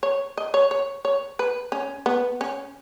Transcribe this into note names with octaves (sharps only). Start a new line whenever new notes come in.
C#5
D#5
C#5
C#5
C#5
B4
C#4
B3
C#4